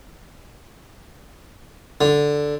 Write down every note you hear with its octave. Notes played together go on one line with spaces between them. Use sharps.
D3